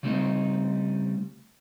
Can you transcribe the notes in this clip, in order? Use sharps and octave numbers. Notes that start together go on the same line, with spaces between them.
C#3 G3 A3 C4 D#4